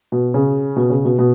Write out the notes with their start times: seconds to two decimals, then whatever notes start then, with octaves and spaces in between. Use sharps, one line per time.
0.12 B2
0.34 C#3
0.76 B2
0.90 C#3
1.05 B2
1.19 B2